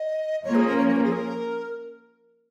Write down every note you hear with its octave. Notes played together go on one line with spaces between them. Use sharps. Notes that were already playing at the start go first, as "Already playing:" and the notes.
Already playing: D#5
F3 A#3 C#4 C#5
G#4
A#4
C#5
C#5
A#4
G#4
A#4